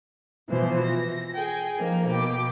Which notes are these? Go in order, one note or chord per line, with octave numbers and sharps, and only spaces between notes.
B2 E3 F3 C5
A#6
G#4 G5
F3 A#3 D#4
B2 G5 D6